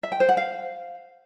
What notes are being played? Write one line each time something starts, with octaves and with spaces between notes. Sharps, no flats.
E5
G5
C5
F#5
F5